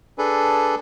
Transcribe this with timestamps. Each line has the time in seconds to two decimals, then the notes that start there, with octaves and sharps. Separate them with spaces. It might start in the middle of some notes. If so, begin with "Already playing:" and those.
0.18 D4 G#4 A4 B4